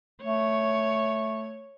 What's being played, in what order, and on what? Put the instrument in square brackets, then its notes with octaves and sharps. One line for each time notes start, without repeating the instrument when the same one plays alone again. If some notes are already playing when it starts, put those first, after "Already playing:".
[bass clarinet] A3 [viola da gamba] C#5